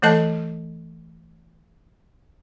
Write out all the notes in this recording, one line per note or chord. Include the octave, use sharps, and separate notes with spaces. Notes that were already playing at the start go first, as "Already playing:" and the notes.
E3 A3 A4 D#5 A5